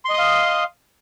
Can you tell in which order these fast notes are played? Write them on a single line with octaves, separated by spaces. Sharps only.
C6 D#5 D#6 F5